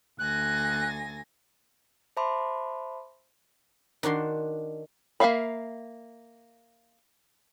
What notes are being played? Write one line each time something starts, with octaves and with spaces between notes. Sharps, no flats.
D2 G#5 F#6 A#6
C5 E5 A5 B5 C6 D6
D#3 D4 F#4 C6
A#3 B4 E5 F5 B5